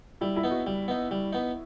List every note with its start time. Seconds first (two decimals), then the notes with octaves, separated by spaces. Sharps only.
0.21 G3 E4
0.36 E4
0.44 B3 D#4
0.51 F#4
0.67 G3
0.88 B3 D#4
1.11 G3
1.33 B3 D#4